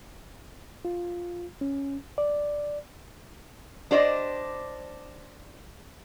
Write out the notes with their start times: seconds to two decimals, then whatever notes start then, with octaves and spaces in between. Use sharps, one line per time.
0.85 F4
1.61 C#4
2.18 D5
3.91 D4 G4 C5 D5 D#5